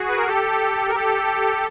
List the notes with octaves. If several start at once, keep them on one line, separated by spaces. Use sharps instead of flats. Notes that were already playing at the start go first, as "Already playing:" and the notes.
Already playing: F#4 G#4
B4
A#4
G4 A4
A#4
G4 A4